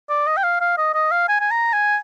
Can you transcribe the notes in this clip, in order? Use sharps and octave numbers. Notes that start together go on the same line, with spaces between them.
D5
D#5
G5
F5
F5
D#5
D#5
F5
G#5
G#5
A#5
G#5